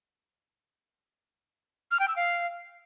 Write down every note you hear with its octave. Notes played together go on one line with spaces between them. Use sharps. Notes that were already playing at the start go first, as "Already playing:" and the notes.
F6
G5
E6
F5